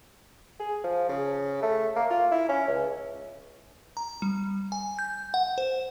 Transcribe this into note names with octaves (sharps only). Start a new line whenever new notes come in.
G#4
F3
C#3
A3
A#3
F4
E4
C#4
C#2
A#5
G3
G#5
G6
F#5
C5